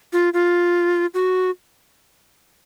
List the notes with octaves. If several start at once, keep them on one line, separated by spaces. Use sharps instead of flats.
F4
F4
F#4